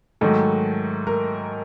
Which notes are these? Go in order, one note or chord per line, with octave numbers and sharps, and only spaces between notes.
G#2 D#3 F#3 A3 A4
A#4